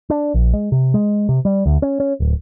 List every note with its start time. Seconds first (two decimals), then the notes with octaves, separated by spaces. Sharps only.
0.10 D4
0.34 A#1
0.53 G#3
0.72 C3
0.94 G#3
1.29 C3
1.45 G3
1.66 D2
1.82 C#4
2.00 C#4
2.20 D1